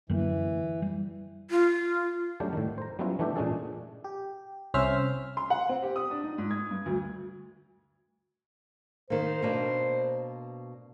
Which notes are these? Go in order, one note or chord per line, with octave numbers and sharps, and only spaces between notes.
F#2 D3 E3 A#3
G3
F4
F#3 G3 A3 C#4 D4 G4
A2 D#3
C5 A#5
F#3 G3 B3 C#4 E4 F4
E3 A3 D4 G4 E5
A#2 G#3 C#4 D4 G#4 A4
G4
C2 C#4 C5 E5 F6
C6
F#5
C4
G4
D#6
D4
D#4
G#2
G#6
G2
D2
D#3 A#3 C5
B2 A#3 D4